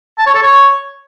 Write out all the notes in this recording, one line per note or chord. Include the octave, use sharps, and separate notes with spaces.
A5
C#5
A4
C#5